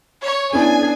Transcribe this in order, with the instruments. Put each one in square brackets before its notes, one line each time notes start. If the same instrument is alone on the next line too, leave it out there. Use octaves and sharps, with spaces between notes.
[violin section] C#5
[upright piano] B3 C#4 E4 [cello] D4 G#4 [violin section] G#5